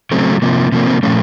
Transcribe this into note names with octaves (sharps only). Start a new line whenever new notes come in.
C#3 F#3 A3 C4
C3 F3 A#3
C3 F3 A#3
C4
A#2 F3 A3 C#4